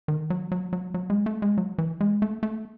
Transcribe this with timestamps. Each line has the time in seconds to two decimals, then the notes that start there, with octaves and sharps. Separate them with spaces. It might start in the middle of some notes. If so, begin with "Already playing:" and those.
0.08 D#3
0.30 F#3
0.52 F#3
0.73 F#3
0.94 F#3
1.10 G#3
1.26 A3
1.42 G#3
1.58 F#3
1.78 E3
2.00 G#3
2.22 A3
2.43 A3